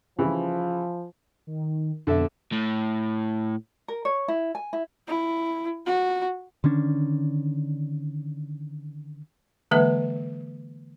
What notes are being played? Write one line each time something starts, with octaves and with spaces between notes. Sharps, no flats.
C#3 E3 F3 G3
D#3
F2 B2 D3 A4 E5
A2
A#4
C#5
E4
G#5
E4
E4
F#4
D3 D#3 C#4 D4
D3 E3 G#3 A#3 B4 E5